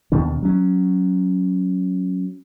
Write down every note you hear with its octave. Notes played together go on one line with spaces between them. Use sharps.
D#2 B2 D#3 D4
F#3 C#4